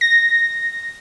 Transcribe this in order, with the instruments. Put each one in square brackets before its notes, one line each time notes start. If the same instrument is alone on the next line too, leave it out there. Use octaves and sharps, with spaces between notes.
[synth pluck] A#6